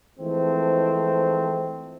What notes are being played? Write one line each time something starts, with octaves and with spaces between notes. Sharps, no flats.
E3 F3 G#3 A3 C4